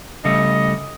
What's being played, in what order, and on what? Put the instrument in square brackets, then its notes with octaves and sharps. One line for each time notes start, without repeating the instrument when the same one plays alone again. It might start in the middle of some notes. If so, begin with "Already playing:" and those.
[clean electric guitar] C#3 G3 A3 [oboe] D#5